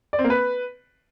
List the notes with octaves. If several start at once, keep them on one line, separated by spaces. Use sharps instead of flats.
D5
C4
A#3
B4